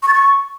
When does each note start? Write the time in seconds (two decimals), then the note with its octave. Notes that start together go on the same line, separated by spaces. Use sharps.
0.03 C#6
0.08 A6
0.13 C#6